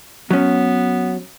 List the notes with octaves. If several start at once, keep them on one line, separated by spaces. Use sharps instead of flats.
F#3 B3 C#4